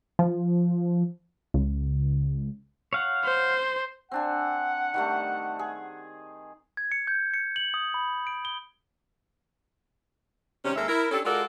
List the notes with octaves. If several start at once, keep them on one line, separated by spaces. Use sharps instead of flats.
F3
C#2
C#5 F5 F#5
C5
C4 D4 F#5 G#5
D#3 G3 A3
G#4
G#6
C#7
G6
C#7
F#7
D#6
B5
D7
G7
C3 D#3 G3 C#4
D#2 G#3 A4 A#4 E5
E4 A#4
C#4 D4 G4 A4
G#3 F4 F#4 A4 A#4 D5